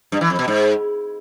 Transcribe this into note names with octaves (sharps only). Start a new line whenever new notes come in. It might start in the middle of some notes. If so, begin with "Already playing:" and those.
G2
E3
F2
B2
G#2